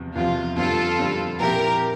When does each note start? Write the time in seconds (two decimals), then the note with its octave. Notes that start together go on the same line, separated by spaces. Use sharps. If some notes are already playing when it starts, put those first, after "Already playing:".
Already playing: E2 C3 F3
0.15 E2 C3 F3 F4
0.57 F2 D3 G3 C4 F4 A4
0.98 F2 D3 G3 C4
1.40 A#2 F3 C4 E4 G4 A#4